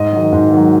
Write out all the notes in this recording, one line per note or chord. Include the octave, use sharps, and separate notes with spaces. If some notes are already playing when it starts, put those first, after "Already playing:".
Already playing: G#2 D#5
D#3 F#3
G#2
D#3 F#3